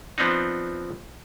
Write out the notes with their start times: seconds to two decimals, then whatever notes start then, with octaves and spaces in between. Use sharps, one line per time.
0.18 F3 B3 C4 D4 D#4